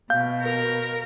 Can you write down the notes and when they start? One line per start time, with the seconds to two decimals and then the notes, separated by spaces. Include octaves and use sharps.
0.10 B2 F5 G6
0.42 A#4